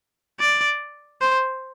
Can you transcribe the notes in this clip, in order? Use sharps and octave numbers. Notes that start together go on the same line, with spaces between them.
D5
C5